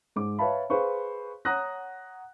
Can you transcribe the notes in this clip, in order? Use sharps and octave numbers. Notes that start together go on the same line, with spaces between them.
G#2 D6
B4 C#5 E5 F5 A5 B5
G#4 B4 C5 F5 C#6
C#5 F#5 A#5 D#6 F#6 A#6